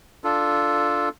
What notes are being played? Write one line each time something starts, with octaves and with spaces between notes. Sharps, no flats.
D4 F4 A4